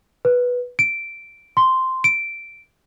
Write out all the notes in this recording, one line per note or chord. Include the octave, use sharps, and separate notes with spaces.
B4
D7
C6
D7